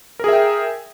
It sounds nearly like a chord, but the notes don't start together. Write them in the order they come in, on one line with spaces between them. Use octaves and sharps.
A#4 G#4 E5 G5